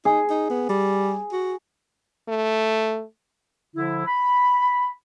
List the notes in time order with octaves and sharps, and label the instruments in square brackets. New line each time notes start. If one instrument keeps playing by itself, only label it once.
[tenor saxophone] D#4 [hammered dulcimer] G#4
[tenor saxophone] D#4
B3
G3
F#4
[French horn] A3
[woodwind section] D3 F3 E4
B5